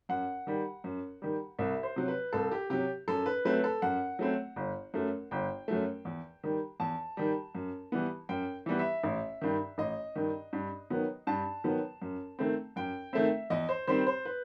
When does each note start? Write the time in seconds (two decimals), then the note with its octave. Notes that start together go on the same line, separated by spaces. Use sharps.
0.09 F#2 F#5
0.47 D#3 G3
0.84 F#2
1.22 D#3 G3
1.59 C2 E5
1.83 C5
1.96 C3 F#3
2.08 B4
2.33 C2 A4
2.51 G4
2.70 C3 F#3 G4
3.08 F#2 A4
3.26 B4
3.45 F#3 A3 C4 B4
3.64 A4
3.82 F#2 F#5
4.19 F#3 A3 C4
4.56 G1
4.94 F#2 F#3 A3
5.31 G1 G5
5.68 F#2 F#3 A3
6.05 E2
6.44 D#3 G3
6.80 E2 A5
7.17 D#3 G3
7.55 F#2
7.92 E3 G3 B3
8.29 F#2 G5
8.66 E3 G3 B3
8.79 E5
9.04 A1
9.41 G2 D#3
9.78 A1 D#5
10.16 G2 D#3
10.53 G2
10.90 D#3 F#3 B3
11.27 G2 A5
11.64 D#3 F#3 B3
12.02 F#2
12.39 D#3 A3 C4
12.76 F#2 G5
13.13 D#3 A3 C4 E5
13.50 E2 D#5
13.69 C5
13.87 D#3 G3 C4 C5
14.07 C5
14.25 B4